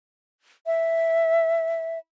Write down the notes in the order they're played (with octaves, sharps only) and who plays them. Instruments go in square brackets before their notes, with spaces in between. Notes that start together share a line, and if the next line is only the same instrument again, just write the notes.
[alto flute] E5